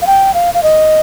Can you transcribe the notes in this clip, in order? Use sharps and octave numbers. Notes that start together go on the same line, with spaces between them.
F5
G5
F5
F5
D#5